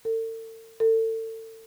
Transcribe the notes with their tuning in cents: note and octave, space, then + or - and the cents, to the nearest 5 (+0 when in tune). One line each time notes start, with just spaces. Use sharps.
A4 +40
A4 +30